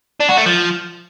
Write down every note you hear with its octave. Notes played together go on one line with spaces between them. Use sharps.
D4
F#4
A3
F3